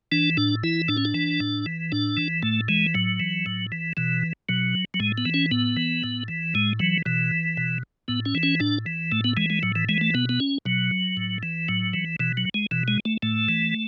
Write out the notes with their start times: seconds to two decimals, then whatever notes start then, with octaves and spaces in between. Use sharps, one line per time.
0.12 E3 D4
0.37 A2 D4
0.64 E3 E4
0.88 A2 D4
0.97 C#4
1.05 D4
1.14 E3
1.40 A2
1.66 E3
1.92 A2 D4
2.17 E3
2.43 A2 A3
2.68 E3 G#3
2.94 A2 F#3
3.20 E3
3.46 A2
3.72 E3
3.97 B2 E3
4.49 B2 F#3
4.94 F#3
5.00 A2 G#3
5.18 B3
5.26 E3
5.34 C#4
5.51 A2 B3
5.77 E3
6.04 A2
6.28 E3
6.55 A2 G#3
6.79 E3 F#3
7.06 B2 E3
7.57 B2
8.08 A2 B3
8.26 C#4
8.35 E3
8.43 C#4
8.60 A2 D4
8.86 E3
9.12 A2 A3
9.24 B3
9.37 E3 G#3
9.50 G#3
9.63 A2 F#3
9.76 E3
9.89 E3 G#3
10.01 A3
10.14 B2 B3
10.29 B3
10.40 C#4
10.65 B2 F#3
11.17 A2
11.43 E3
11.68 A2 F#3
11.94 E3
12.20 B2 E3
12.37 F#3
12.54 G#3
12.71 B2 E3
12.88 G#3
13.05 A3
13.22 A2 A3
13.49 E3